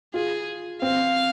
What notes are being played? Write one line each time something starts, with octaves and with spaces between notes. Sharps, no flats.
F4 G#4
C4 F5